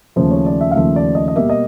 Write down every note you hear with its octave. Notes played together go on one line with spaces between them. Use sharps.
D#2 C#3 F3 A3 C5
C#5
D5
E5
F5
D#2 C#3 F3 A3 E5
D5
D#5
D#5
B2 G3 A#3 E5
D#5